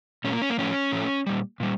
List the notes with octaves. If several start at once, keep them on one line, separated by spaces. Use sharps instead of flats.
A#2 A3 C#4
A#3
C#4
A#3
A2 F3 A3 C#4
A2 F3 A3
A#2 G3
A#2 G3